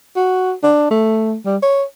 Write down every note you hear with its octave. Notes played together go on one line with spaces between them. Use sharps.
F#4
D4
A3
G3
C#5